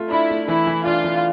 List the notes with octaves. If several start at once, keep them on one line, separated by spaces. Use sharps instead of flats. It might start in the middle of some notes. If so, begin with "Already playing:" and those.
Already playing: A3 F4
D4 E4
A3
E3 E4
E3
D4 F4
E3